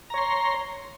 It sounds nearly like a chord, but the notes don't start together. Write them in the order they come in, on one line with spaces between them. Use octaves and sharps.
A#5 C#5 C6